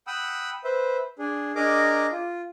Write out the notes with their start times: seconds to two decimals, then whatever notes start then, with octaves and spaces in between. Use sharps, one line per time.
0.07 F#5 G5 B5 D#6 E6
0.64 B4 C5 E5
1.19 D4 G#4
1.56 D4 G#4 A#4 D#5 A#5 D6
2.12 F4